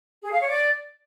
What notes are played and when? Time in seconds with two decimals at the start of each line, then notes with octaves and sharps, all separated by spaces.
0.24 G#4
0.32 F5
0.40 C#5
0.48 D5